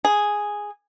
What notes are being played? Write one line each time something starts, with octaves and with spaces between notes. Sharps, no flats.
G#4